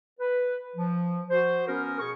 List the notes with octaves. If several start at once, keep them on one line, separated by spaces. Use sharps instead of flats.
B4
F3
F#4 C5
B3 C#4 A#4
B2 G#4 C#6